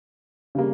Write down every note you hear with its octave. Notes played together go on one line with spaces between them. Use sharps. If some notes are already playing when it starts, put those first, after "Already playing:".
C#3 G3 A#3